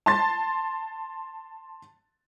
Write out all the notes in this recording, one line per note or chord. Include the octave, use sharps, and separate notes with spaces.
A5 C6 A6